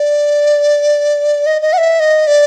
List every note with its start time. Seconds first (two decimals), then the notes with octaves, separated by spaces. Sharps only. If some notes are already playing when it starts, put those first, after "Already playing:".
Already playing: D5
1.46 D#5
1.62 D#5
1.73 F#5
1.78 E5
2.00 D#5
2.27 D5